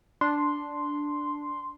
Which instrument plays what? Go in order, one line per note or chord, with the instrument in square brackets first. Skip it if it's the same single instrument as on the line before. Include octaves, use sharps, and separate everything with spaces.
[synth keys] D4 [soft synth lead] C6